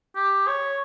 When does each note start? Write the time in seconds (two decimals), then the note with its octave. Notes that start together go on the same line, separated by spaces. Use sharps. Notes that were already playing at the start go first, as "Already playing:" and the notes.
0.16 G4
0.48 C#5